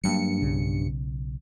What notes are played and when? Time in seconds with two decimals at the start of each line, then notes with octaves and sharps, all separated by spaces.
0.04 G2 F#3 G3 A#3 C#7
0.41 B1 C#3